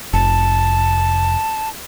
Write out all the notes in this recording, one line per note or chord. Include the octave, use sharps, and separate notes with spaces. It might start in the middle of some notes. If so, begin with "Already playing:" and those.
F1 A5